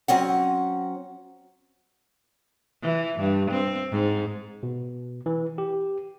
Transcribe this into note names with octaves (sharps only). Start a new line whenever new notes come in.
F#3 C4 C#4 F#5
E3
G2
C4
G#2
B2
E3
G4